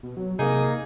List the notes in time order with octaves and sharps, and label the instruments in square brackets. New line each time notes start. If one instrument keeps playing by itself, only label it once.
[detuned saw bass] B2
F#3
[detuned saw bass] C3 [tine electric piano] A#3 D#4 [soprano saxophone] G#4